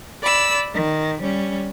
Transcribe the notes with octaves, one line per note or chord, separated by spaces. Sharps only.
D5 B5 E6
D#3
G3 C#4